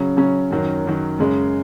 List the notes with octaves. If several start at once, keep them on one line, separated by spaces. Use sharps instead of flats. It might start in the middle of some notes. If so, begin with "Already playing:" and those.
Already playing: C#3 F#3 C#4
C#3 F#3 C#4
F#2 D#3 F#3
F#2 D#3 F#3
F#2 C#3 G#3